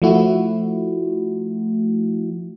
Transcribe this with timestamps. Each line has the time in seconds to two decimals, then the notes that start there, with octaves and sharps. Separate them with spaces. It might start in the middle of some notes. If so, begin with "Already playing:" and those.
0.02 F3 A3 E4 F#4